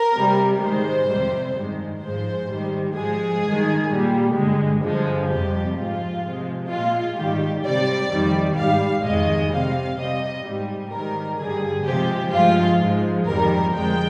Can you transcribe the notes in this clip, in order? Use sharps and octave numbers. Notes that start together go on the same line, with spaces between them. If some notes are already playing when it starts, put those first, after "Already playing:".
Already playing: A#4
C3 G3
G#2 D#3 G#3 C5
F2 C3 G3
G2 D#3 G#3
G#2 F3 G#3 C5
G#2 D#3 G3
G#2 F3 G#3 G#4
G2 D#3 G#3
A#2 G3
G2 D3 G#3
G2 D3 F3 G#3
F2 C3 G3 G4
G#2 F3 G#3 F4
C3 F3 G#3
A#2 G#3 F4
G#2 D#3 G3 G4
C3 G3 D5
F2 D#3 G3
G#2 G3 F5
F2 D#3 G#3 D#5
C3 G3 F5
C3 G3 D#5
G#2 G3
G#2 D#3 G3 A#4
G2 D3 G3 G#4
C3 F3 G#3 G4
G2 F3 G#3 F4
G#2 F3 G#3
F2 D#3 G3 A#4
F2 D3 F3 G#3 G5